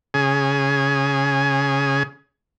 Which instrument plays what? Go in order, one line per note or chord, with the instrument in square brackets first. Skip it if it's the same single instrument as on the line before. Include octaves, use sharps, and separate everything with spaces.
[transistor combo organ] C#3 G#4